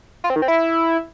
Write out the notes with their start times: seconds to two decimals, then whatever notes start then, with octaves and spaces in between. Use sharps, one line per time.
0.24 F4
0.30 C4
0.36 D#3
0.42 C4
0.48 E4